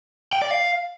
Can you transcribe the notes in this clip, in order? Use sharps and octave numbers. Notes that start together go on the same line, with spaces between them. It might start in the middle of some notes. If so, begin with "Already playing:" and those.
G5
D5
F5